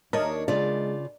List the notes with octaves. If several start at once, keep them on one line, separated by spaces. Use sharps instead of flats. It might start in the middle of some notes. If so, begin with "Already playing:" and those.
D#2 D4 A#4 C#5 D#5 A5
C#3 G#3 F4 D5